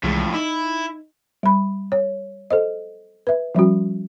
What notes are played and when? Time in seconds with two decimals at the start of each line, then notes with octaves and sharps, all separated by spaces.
0.03 C2 F2 A2 E3 G#3
0.34 D#4 E4
1.43 G3 B5
1.92 C#5
2.50 A4 C5 D#5
3.27 B4 E5
3.55 F3 G3 C#4 F#4